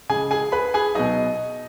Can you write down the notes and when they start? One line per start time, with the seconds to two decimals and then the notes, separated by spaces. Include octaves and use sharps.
0.09 C#3 G#3 G#4 G#5
0.31 G#4 G#5
0.52 B4 B5
0.74 G#4 G#5
0.95 B2 F#3 D#4 D#5